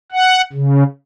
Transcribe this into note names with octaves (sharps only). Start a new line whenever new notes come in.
F#5
C#3